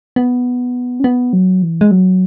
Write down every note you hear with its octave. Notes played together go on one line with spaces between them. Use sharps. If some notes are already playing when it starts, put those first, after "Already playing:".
B3
C#4
B3
F#3
E3
G#3
F#3